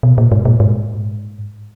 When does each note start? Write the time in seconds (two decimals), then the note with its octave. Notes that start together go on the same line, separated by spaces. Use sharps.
0.03 B2
0.18 A#2
0.32 G#2
0.45 A#2
0.60 G#2